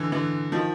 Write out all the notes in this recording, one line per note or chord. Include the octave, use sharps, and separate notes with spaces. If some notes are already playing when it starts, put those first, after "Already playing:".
Already playing: D3 E3
D3 E3
D#3 F3